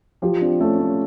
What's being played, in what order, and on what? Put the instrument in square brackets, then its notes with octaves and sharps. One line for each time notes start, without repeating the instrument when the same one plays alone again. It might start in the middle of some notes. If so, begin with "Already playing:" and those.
[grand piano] F3 [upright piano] F4 G4
[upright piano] C4 D4
[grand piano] A3 [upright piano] C#4
[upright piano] C#4